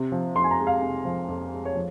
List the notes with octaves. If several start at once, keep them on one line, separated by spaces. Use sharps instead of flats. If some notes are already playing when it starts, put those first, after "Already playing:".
Already playing: C3
F3
F2 C6
G#5
A#5
G#3
F5
C3
F3
F2
G#3
C#5
F3